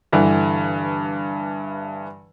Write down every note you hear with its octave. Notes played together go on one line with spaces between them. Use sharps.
G2 D3 E3